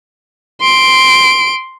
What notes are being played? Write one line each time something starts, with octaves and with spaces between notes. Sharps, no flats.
C6 D7